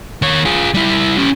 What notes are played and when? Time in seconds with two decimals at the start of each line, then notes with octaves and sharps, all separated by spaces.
0.22 D#3 C#5
0.45 F4 G#4
0.74 G3 E4
1.18 C#4 G4